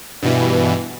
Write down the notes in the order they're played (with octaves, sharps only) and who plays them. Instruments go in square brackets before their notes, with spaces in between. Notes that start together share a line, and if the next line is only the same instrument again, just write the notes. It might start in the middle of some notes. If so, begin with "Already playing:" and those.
[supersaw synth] G2 B2 E3